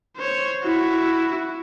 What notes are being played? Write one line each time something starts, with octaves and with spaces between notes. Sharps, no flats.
C5 C#5
E4 F#4